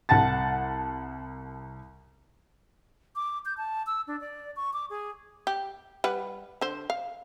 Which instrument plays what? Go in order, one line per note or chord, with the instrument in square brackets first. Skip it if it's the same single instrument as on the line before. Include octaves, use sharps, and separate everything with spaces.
[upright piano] C2 F#5 A5 A6
[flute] D6
G6
A5
E6
D4
D5
C#6
D6
G#4
[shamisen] G4
G3 B4 F#5
D3 C5
F5